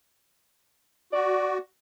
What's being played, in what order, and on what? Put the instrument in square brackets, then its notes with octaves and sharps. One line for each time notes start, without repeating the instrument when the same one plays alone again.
[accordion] F#4 [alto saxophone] D5